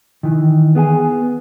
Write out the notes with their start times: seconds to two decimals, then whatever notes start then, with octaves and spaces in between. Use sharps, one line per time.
0.23 D#3 E3
0.75 B3 G#4 G5 G#5